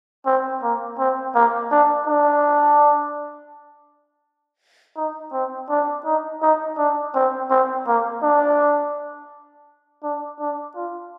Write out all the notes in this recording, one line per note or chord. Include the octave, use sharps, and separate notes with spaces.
C4
A#3
C4
A#3
D4
D4
D#4
C4
D4
D#4
D#4
D4
C4
C4
A#3
D4
D4
D4
F4